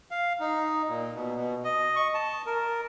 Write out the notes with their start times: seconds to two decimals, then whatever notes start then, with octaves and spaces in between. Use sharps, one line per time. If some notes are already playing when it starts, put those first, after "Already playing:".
0.11 F5
0.40 D#4
0.89 A#2
1.15 B2
1.36 B2
1.64 D#5
1.96 C#6
2.14 A5
2.46 A#4